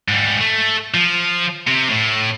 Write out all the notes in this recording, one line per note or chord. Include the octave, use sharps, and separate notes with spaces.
G#2 G3
A3
F3
C3
A2